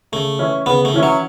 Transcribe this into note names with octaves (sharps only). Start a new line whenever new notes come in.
C#3 A3
E3 C#4 E4
C#3 B3
A3
E3 C#4 E4
F#3